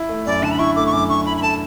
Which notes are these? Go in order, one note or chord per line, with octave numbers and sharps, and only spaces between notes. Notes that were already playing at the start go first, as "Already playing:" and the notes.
Already playing: E4
A3
F#2 D5
D3 A5
B5
E4 C#6
A3 D6
C#6
F#2 D6
D3 C#6
E4 B5
B5
A3 A5